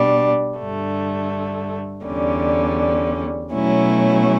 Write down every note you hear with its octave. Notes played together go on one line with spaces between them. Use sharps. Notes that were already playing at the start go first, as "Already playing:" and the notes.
Already playing: B2 G3 D4
G2 D3 A3
E2 D3 G3 C#4
B2 F#3 A3 C#4 E4